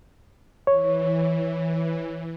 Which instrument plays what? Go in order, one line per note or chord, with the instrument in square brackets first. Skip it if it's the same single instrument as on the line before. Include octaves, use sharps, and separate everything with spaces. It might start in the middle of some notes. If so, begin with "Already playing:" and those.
[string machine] E3 [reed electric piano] C#5